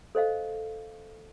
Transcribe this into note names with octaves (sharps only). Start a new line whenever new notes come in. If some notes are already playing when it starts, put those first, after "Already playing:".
A4 C5 D#5 F5